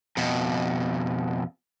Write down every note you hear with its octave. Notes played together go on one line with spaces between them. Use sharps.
F2 B2